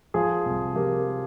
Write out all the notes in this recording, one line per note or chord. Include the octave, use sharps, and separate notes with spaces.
F3 F4 G#4
C2
F3 G4 A#4